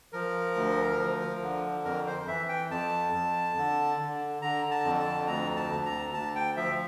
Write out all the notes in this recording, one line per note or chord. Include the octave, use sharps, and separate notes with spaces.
F3 A#4
D2
F3
D3
F2 A#4
C5
E3 E5
G5
F2 A5
F2
D3
D3
D3 A#5
A5
F2
A5
D2 A#5
A5
D2
A#5
D2 A5
G5
F3 E5